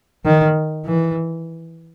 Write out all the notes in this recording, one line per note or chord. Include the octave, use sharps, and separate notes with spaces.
D#3
E3